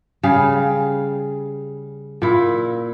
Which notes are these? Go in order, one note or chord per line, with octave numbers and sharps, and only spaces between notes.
C#3 G3 G#4 F5
A#2 E4